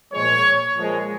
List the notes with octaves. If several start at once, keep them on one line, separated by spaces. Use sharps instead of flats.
A#2 F3 G#3 C#5
A#2 F3 G#3